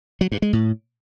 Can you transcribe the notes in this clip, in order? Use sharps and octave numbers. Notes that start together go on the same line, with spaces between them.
F#3
G2
G#3
A2